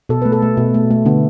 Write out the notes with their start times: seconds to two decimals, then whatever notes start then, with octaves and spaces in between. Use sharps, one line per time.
0.09 B2 A4
0.22 A3 B4
0.32 A4
0.42 A3
0.57 B2
0.74 A3
0.91 A3
1.06 D3 B3